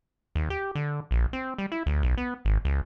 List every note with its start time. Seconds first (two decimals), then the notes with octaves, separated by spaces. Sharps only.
0.35 D#2
0.50 G4
0.75 D3
1.11 A#1
1.33 C4
1.58 G3
1.72 E4
1.86 D2
2.03 B1
2.18 B3
2.45 G#1
2.65 C#2